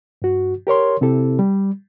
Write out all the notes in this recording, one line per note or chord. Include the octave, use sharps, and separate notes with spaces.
G2 F#4
G4 A#4 C#5 C6
C3 C4 E4 G4 A4
G3